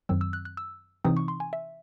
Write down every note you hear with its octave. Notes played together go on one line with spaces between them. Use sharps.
F#2 D#3 F#3 C4 E6
E6
F#6
F#6
E6
C3 E3 C4 D#4 D#6
C#6
C6
G#5
E5